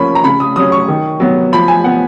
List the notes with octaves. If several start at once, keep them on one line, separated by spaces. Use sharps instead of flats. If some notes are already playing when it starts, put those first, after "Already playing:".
Already playing: F3 A#3 C#4 B5 C#6
A#5
C#3 B5
D#6
F#3 C#4 D#6
C#6
D#3
F#3 B3
F3 B5
G#5
B3 F#5